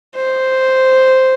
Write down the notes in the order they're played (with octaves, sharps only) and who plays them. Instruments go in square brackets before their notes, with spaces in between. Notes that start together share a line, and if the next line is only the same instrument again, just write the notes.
[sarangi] C5